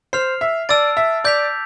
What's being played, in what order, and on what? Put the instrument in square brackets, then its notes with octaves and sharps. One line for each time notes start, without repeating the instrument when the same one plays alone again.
[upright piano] C5 [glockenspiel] F6 C7 F7
[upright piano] E5
[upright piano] D5 [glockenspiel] A5 E6 A6 D7
[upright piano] E5
[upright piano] D5 [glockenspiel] D6 G6 B6 F7